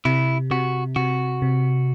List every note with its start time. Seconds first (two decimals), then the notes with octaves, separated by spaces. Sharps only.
0.05 C3 E4
0.51 C3 F#4
0.96 C3 F#4
1.42 C3